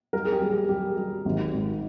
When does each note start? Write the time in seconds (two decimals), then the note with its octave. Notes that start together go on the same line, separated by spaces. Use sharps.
0.13 G3 A#4
0.25 G#4
0.32 G4
0.41 G3
0.51 G4
0.69 G3 G4
0.97 G3
1.25 G#1
1.53 G#2